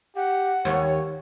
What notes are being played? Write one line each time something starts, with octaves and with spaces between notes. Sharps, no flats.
G4 F#5
D#2 C#5